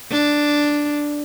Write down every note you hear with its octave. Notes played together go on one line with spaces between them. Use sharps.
D4